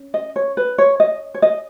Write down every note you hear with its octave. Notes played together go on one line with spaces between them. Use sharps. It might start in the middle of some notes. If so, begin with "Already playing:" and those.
Already playing: C#4
D#5
C#5
B4
C#5
D#5
C#5
D#5